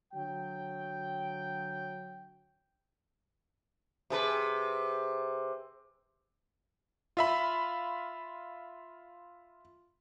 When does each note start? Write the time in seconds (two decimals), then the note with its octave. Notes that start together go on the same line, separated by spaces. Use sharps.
0.13 D3 F#3 G5
4.10 C3 G#4 B4
7.17 F4 E5 B5